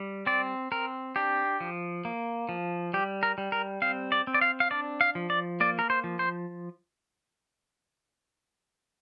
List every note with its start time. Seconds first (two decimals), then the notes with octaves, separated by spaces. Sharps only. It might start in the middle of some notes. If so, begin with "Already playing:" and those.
Already playing: G3
0.26 C4 D5
0.72 C4 A#4
1.16 D4 G4
1.60 F3
2.05 A#3
2.49 F3
2.94 G3 G4
3.23 A#4
3.38 G3
3.52 A#4
3.82 C4 F5
4.12 D5
4.27 C4
4.35 D5
4.41 F5
4.60 F5
4.71 D4 D5
5.01 F5
5.15 F3
5.30 D5
5.60 A#3 D5
5.79 A#4
5.90 C5
6.04 F3
6.19 C5